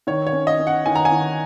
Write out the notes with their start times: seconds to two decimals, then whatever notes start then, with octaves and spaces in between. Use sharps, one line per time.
0.07 D#3 C#5
0.27 C#5
0.33 C#4
0.47 D#5
0.59 C#4
0.67 F#5
0.86 D#3 G#5
0.96 A#5
1.05 G#5
1.12 D#3